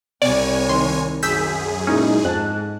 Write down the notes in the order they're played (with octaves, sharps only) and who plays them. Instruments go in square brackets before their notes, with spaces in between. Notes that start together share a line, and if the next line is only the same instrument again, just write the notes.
[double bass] C2 [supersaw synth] C#5 G#5 [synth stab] D5
[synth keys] D#3 [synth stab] C6
[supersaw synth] F#2 G#4 [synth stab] E6 G6 B6
[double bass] A#2 [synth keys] G#3 D#4 E4 [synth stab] C#4
[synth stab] F2 [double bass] G#2 [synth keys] A5 F#6